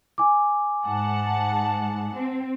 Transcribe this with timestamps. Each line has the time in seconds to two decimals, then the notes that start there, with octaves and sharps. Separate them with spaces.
0.18 G#5 D6
0.85 G#2 F#5 A5
2.15 C4